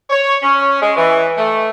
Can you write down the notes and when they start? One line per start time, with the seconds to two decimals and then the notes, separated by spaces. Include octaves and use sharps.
0.10 C#5
0.43 C#4
0.81 G#3
0.97 E3
1.37 A3